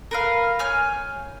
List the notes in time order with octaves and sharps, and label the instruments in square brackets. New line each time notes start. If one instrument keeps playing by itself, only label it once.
[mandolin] A#4 B4 F5
C#5 G#5 F6 G6